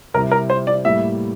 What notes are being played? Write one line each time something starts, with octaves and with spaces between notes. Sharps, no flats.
C3 G3 C4 E4 A#4
A#4
C5
D5
A2 G3 A#3 E4 E5